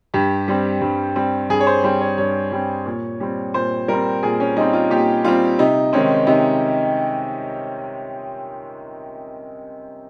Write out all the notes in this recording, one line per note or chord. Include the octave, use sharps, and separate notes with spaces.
G2 G4
G3 C4
G2
G3 C4
G2 G#4
C#5
C5
G3 C4 C5
C#5
G2 C#5
G3 C4
A#2
G3 C4
A#2 C5
G3 C4 A#4
A#2 G#4
C#4
G3 C4 D#4
F4
A#2 G4
G3 C4 F4
C3 D#4
D#3 G#3 C4 C#4
C3 D#4